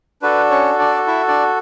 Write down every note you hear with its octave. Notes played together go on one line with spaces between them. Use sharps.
D4 F#4 A4 B4
C#4 C#5
D4 D5
E4 E5
D4 D5